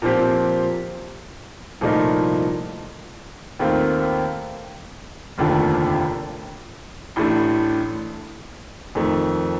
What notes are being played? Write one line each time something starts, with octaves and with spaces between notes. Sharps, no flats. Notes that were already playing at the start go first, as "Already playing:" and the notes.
A#2 F3 C4 G4
C2 A#2 F3 A3 D#4
D#2 D#3 A3 C4 F4
F1 D#2 D3 F3 A3
A1 A2 A3 D4
F2 D#3 A3